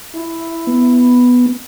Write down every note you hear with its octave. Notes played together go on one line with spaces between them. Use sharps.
E4
B3